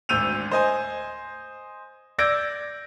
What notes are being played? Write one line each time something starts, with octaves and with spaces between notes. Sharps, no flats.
G#1 D2 E6 G6 D#7 F7
C5 D#5 G#5
D5 E6 G6 G#6 A#6 D7